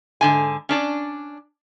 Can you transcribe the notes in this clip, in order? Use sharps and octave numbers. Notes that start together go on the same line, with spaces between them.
G#2 D3 G#5
C#4 D4 D5